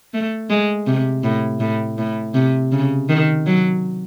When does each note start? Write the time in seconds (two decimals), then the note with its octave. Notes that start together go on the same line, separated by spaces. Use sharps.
0.14 A3
0.50 G#3
0.87 C3
1.23 A2
1.60 A2
1.98 A2
2.34 C3
2.72 C#3
3.09 D#3
3.46 F#3